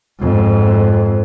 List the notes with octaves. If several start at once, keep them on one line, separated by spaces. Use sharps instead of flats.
F2 G#2